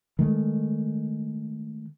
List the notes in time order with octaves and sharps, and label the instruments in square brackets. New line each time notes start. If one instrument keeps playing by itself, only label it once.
[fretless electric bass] D#3 G#3 A3